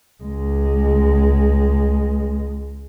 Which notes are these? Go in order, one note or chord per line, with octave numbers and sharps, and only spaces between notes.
C#2 G#3